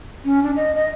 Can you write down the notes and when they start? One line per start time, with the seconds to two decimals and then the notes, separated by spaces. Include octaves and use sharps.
0.25 C#4
0.43 D4
0.56 D#5
0.75 D#5